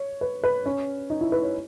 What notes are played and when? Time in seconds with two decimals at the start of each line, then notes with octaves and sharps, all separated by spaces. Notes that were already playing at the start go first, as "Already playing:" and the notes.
Already playing: C#5
0.21 B4
0.44 B4
0.66 C#4
1.10 D#4
1.21 E4
1.32 B4
1.43 C#5